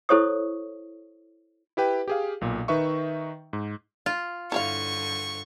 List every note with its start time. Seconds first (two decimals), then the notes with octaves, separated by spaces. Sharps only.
0.09 E4 A4 C5 C#5 C#6 D#6
1.77 E4 G4 B4 G5
2.08 G4 G#4 F5
2.41 B1 A#2
2.68 D#3 D#4 B4 E5 C#6
3.53 G#2
4.06 F4 F5
4.52 G2 D3 E4 C#5 F5 C#6